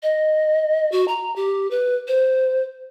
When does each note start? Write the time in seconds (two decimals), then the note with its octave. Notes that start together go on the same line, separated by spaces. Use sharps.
0.03 D#5
0.92 F#4
1.08 A#5
1.36 G4
1.71 B4
2.08 C5